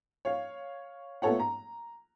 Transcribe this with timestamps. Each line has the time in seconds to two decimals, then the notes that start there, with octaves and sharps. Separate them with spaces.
0.25 C#5 F5
1.22 A3 B3 F4 A4 C#5 F#5
1.39 A#5